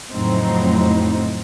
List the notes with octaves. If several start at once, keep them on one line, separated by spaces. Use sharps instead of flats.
F2 A2 C#3 F#3 C4 D#4